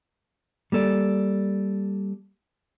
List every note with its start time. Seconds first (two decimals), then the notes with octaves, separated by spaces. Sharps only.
0.72 G3 A#3 A4 D5